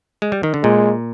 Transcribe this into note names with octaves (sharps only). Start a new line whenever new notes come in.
G#3
G3
D#3
D3
A#2 G#3